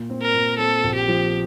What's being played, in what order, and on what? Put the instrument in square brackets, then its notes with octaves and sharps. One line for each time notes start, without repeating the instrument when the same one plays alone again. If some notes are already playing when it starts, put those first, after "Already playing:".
Already playing: [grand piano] A#2
C4
[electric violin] A#4
[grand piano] A#2
[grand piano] C4 [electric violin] A4
[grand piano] A#1
[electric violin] G4
[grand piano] F3